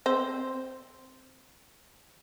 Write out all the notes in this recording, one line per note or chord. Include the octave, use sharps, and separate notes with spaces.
C4 C5